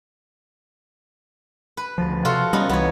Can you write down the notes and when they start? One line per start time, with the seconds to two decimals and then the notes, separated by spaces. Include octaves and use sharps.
1.77 B4
1.98 D2 F3
2.25 C3 F4 F#4 A4
2.53 G3 B3 C#4 D#4
2.69 C2 E3 B3 C#5